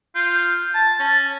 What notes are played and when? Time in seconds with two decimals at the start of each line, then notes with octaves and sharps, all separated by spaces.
0.15 F4 G6
0.44 G6
0.74 A5 A6
0.99 C#4